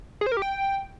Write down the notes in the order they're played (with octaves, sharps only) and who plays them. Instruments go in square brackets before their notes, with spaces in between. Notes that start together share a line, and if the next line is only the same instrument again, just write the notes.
[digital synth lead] G#4
C5
A#4
G4
G5